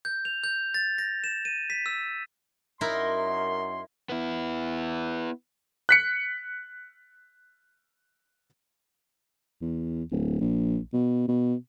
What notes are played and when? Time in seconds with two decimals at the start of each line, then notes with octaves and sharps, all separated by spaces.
0.05 G6
0.25 F7
0.44 G6
0.74 A6
0.98 A#6
1.24 E7
1.45 D#7
1.70 B6
1.86 E6
2.81 F#2 D#4 E4 A#4 C6
4.09 B3 E4
5.89 F#6 B6 C#7
9.61 E2
10.11 D1
10.41 A#1
10.93 B2
11.28 B2